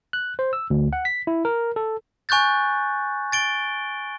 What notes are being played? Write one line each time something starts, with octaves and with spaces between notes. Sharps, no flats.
F#6
C5
E6
D2
F#5
B6
E4
A#4
A4
G#5 C#6 F#6 G6 A6
A6 D7 G7